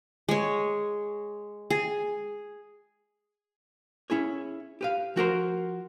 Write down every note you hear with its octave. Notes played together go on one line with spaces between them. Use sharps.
G#3 C#5
G#4
C#4 E4 G#4 C#5
G4 B4 F5
F3 F#4 A#4 C5